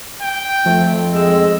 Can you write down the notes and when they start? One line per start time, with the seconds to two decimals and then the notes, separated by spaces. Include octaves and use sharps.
0.22 G5
0.66 F2 F3 A3 C4
1.15 G#3 E6